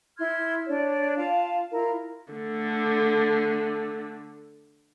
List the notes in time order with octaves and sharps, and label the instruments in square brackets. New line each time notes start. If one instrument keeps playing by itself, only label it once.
[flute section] E4 C6 F6 G#6
D4 C#5 D5
F4 F5 A5
E4 F4 A#4
[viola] D3 A3